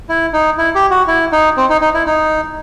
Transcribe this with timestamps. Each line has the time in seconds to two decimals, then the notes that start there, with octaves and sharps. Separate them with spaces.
0.09 E4
0.33 D#4
0.58 E4
0.75 G4
0.91 F#4
1.08 E4
1.32 D#4
1.57 C4
1.69 D#4
1.81 D#4
1.94 E4
2.06 D#4